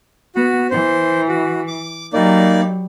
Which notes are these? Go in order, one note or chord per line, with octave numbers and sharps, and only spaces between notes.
B3 F#4
E3 C5
F#4
D6
F#3 G3 A#3 D#4 D5